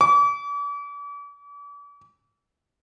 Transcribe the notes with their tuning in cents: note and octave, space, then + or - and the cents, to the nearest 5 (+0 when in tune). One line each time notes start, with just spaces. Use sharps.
D6 -40